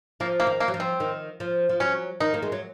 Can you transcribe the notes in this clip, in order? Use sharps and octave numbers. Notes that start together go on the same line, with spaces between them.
F3 A#3
A#3
D#3
A#3
F#3
F3
C4
D#3
F3
F3
F#3 C#4
D#3 D#4
A#3
G#3
F#3